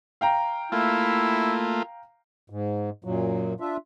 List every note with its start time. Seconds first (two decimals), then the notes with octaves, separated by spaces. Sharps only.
0.21 F5 G5 A#5
0.72 A3 A#3 E4 F4
2.50 G#2
3.04 F#2 A#2 F#3
3.60 D4 F4 E5